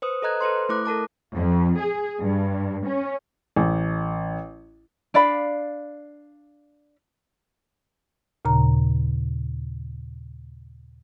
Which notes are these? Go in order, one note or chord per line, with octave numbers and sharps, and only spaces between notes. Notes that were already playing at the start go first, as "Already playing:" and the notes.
B4 C5 D#6
A4 B4 D#5 A#5 F#6 G#6
A4 B4 C5 C6
A3 E4 D6 F#6
A4 A#4 A5 D6
F2
G#4
G2
C#4
A1
D4 D5 F5 B5
D#2 A#2 C#3 A#5